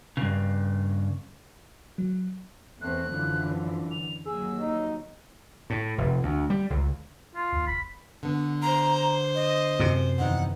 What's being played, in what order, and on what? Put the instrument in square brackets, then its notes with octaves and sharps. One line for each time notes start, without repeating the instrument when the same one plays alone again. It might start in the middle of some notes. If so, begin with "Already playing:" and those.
[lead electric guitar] G2 C#3
[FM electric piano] F#3
[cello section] E2 B3 C4 [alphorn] A3 [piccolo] F#6
[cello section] F#2 D3 E3 [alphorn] F3
[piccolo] F7
[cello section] D#2 F#3 [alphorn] G#4 [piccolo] E6
[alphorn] D#4
[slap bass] A2
F1
D2
G3
C#2
[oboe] F4
[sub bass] D#2
[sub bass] F1 [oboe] B5
[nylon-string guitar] D3 B3
[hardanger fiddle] C5 [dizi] A#5
[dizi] D#5
[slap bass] F#2 C3
[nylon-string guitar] E2 D#3 D#4 [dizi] F#5